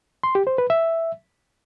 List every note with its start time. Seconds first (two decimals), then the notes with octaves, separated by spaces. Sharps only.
0.23 C6
0.35 G4
0.47 C5
0.58 B4
0.70 E5